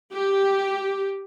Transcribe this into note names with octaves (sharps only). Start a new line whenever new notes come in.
G4